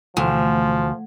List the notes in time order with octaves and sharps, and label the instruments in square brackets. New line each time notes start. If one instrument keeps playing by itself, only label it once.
[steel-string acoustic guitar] D2 [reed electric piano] B2 E3 A3 [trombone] F3